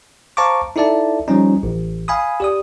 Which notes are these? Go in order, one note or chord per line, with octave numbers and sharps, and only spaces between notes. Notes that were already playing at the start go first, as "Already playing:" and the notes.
C5 F5 A5 A#5 C#6 D6
D#4 E4 A4 D5 E5 A5
F3 G3 C#4 D#4
A1
F5 G#5 B5 D#6
G4 D5 D#6